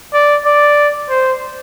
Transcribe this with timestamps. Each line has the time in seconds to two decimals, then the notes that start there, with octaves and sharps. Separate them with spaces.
0.14 D5
0.45 D5
1.10 C5